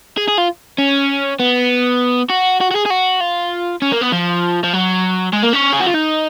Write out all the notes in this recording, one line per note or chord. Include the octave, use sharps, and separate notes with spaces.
G#4
G#4
F4
C#4
B3
F#4
F#4
F#4
G#4
G#4
F#4
F4
C#4
A#3
B3
F3
F3
F#3
G#3
A#3
C#4
G#4
F#4
F4
D#4